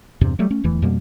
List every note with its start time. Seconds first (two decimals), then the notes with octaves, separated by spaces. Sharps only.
0.21 E2 G2 C3
0.39 F#3 G3 A3
0.51 A3 C#4
0.64 D1 E2 E3 A3
0.82 F2 B2 G3 A#3